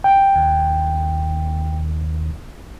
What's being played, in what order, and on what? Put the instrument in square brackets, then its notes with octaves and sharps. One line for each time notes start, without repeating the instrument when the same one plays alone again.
[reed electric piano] G5
[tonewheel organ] D#2